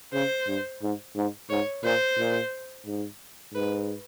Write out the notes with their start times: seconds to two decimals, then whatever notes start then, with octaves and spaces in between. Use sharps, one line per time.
0.13 C#3 C5
0.47 G2
0.82 G#2
1.16 G#2
1.49 G#2 C#5
1.84 A#2 C5
2.18 A#2
2.86 G#2
3.54 G#2 B4